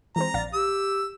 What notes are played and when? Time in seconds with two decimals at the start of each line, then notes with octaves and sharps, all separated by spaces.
0.16 E3 G#3 C4 A#5
0.34 A#1 D5 F5 A6
0.54 G4 E6